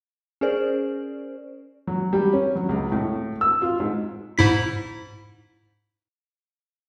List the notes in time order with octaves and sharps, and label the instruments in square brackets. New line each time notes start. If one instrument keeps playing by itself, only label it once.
[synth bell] C#4 G#4 A#4 C5 D5
[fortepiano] F#3
G3
C#4
F#3
C#2
A2
E6
F4
G#2
[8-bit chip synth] G#2 E4 B6